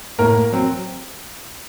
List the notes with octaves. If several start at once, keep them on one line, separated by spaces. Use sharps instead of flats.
A2 A#3 A#4
F#3 C4